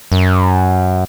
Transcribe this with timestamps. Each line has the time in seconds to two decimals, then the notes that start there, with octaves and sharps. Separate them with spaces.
0.12 F#2